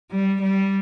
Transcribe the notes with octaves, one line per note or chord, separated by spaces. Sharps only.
G3
G3